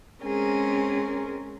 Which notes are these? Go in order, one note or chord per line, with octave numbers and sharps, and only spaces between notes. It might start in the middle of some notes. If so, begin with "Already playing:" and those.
G#3 C4 C#4 G#4 A#4